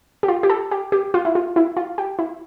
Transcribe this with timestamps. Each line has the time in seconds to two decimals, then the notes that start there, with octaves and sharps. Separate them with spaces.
0.23 G4
0.28 F4
0.43 G4
0.50 A4
0.71 G4
0.92 G4
1.14 F4
1.25 E4
1.35 F4
1.56 E4
1.77 F4
1.98 G4
2.19 E4